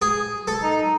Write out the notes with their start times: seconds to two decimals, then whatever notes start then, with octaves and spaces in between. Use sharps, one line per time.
0.02 G#4
0.47 A4
0.63 D#4